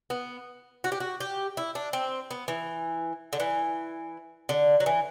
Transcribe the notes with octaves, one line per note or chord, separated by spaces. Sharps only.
B3
F#4
G4
F#4
G4
E4
D4
C4
B3
E3
D3
E3
D3
F#3
E3